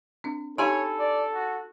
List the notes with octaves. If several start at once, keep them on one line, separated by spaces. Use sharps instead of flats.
C4 D4
D#4 G4 A4 C#5 F5 G#5 B5
D5
F#4